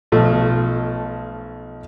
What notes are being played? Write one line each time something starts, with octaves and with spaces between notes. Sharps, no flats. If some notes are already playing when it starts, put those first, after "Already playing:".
B1 F3 A3